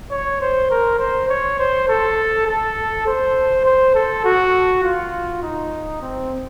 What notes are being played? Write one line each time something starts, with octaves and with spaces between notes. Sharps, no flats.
C#5
C5
A#4
C5
C#5
C5
A4
A4
C5
C5
A4
F#4
F4
D#4
C4